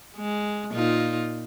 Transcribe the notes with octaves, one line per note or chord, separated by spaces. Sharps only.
G#3
A#2 D#4 F4